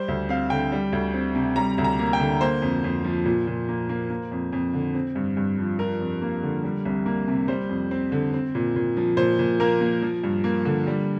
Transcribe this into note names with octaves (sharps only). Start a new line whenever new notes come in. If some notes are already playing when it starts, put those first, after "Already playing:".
Already playing: G3 C5
D2
C4 F5
D3 G5
G3
D2
C4
C3
G3 A#5
D2
A#5
A#3
G5
D3
A#3 C5
F2
F2
F3
A#2
A#2
A#3
A#3
A#3
F2
F2
D3
C4
G2
G2
F3
F3 A#4
F2
A#3
D3
G3
C2
A#3
C3
G3 C5
F2
C4
D3
C4
A#2
A#2
F3
A#2 C5
A#2
A#3 A#4
A#3
F3
G2
A#3
D3
G3